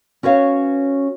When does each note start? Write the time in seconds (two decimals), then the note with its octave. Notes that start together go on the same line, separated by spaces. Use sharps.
0.23 C#4 F#4 B4 C#5 F5